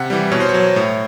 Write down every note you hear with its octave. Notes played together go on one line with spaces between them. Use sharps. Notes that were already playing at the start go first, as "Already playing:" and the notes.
Already playing: C3 F#5
E3 G3
B2 C#5
C5
C#5
F#3
A2